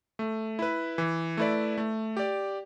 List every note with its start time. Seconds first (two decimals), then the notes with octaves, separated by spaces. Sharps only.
0.19 A3
0.59 E4 B4
0.98 E3
1.37 A3 E4 B4 D5
1.78 A3
2.17 G4 D5